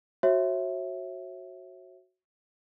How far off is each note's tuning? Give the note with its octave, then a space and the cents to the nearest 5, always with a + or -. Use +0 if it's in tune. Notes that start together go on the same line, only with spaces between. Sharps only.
F#4 +0 C#5 -40 E5 +0